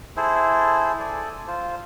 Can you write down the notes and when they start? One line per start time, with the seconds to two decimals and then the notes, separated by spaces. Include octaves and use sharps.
0.17 E4 G#4 A4 C5
0.99 A4 D5 G#5
1.47 F4 C5